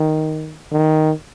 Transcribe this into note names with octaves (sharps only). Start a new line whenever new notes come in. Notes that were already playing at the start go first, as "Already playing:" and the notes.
Already playing: D#3
D#3